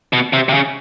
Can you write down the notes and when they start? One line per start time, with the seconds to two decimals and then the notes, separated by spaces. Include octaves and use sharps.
0.13 B2
0.33 C3
0.49 C3
0.54 C#3